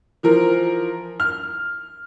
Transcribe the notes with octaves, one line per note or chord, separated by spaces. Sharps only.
E3 F3 A#4
F6